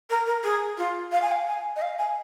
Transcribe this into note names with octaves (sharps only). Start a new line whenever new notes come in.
A#4
A#4
G#4
F4
F5
G#5
F5
G#5
D#5
F5
G#5